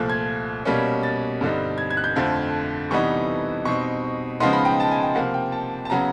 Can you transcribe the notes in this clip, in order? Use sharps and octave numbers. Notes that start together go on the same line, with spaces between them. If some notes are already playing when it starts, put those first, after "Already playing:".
Already playing: C2 A#2 F3 A3 F#6
G#6
B2 G3 A#3 C#4
A6
G2 D3 G3 C4 D#4
G#6
G#6
F#6
G6
F2 D3 F3 A3
C3 E3 G3 B3 D#4 C#6
B2 G3 C4 D#4 C#6
C#3 F3 G#3 B3 D#4 C6
B5
G5
A5
G#5
G5
C3 F3 A#3 F#5
G5
A5
A5
C#3 F#3 B3 A#5